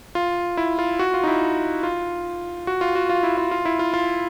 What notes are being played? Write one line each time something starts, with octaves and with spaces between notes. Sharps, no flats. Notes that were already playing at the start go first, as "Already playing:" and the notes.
F4
E4
F4
F#4
F4
D#4
E4
F4
F#4
F4
F#4
F4
E4
F4
F4
E4
F4
F4